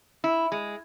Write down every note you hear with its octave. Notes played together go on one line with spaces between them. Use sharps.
E4
G#3